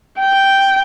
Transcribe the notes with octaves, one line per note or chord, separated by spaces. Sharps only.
G5